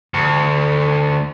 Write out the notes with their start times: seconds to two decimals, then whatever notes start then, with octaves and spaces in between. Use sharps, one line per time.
0.14 D2